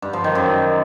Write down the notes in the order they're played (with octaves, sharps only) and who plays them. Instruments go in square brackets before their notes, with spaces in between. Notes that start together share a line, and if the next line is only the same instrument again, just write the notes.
[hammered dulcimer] G2
F3
D#3
F#2